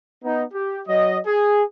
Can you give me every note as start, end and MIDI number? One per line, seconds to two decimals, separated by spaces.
0.24 0.42 59
0.24 0.42 63
0.53 0.80 67
0.86 1.17 54
0.86 1.17 75
1.25 1.62 68